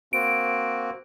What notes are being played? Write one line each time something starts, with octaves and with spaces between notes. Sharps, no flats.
A#3 C4 F#4 D7